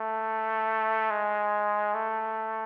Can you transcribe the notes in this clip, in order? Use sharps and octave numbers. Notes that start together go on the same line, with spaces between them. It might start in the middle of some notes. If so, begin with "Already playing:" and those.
Already playing: A3
G#3
A3